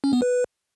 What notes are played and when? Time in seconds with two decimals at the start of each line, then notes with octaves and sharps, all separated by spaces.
0.04 C#4
0.13 B3
0.22 B4